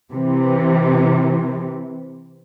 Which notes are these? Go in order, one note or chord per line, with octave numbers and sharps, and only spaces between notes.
C3 E3